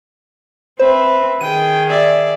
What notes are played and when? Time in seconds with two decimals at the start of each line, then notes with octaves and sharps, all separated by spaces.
0.79 C4 B4 C5 E5
1.41 D#3 G#4 G5 D#7
1.90 D5 E5